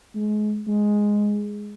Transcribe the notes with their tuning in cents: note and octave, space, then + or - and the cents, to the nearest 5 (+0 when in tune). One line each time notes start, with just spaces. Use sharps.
G#3 +30
G#3 +0